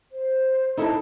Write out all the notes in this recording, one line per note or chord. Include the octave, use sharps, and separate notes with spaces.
C5
D#4 E4 A4